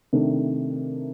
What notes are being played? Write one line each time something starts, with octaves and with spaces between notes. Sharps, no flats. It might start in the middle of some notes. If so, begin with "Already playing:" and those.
C3 D#3 A3 D4